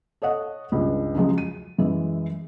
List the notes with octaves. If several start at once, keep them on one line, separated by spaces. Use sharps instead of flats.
A4 C#5 D#5 F#5
C#2 G2
C#3 F3 F#3 G#3
D#7
F#2 E3 G#3 E4